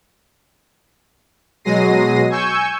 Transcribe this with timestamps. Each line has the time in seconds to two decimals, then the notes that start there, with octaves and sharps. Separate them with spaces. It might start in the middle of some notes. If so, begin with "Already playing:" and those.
1.64 B2 F#3 G#3 A#6 C7 D#7
2.30 G#5 C#6 E6 G6